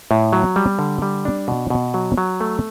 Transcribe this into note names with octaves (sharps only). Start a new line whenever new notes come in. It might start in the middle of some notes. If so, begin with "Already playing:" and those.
A2
F#3
G3
D3
G3
D4
B2
B2
F#3
F#3
A3